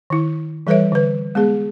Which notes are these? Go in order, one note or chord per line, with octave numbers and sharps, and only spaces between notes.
D#3 E4
E3 G3 A4 B4 C#5 E5
D3 B4
G#3 B3 G#4